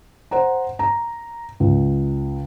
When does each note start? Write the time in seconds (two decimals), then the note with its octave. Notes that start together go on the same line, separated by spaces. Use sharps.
0.31 C5 F#5 A#5
0.79 A#5
1.60 C#2